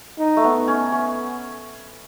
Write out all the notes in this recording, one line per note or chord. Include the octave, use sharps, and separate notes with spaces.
D#4
A3
B3
C#4
C#4